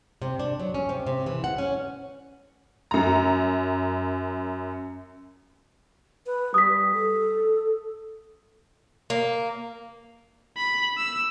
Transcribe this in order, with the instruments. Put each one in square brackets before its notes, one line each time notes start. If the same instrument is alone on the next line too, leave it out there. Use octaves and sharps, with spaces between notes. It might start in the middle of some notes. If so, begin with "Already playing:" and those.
[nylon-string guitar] C3
D4
F#3
C#4
C3
C3
E3
F#5
C#4
[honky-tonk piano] F#2 A#5
[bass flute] B4
[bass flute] G3 [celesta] D#6 B6
[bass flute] A4
[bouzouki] A#3
[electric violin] B5
E6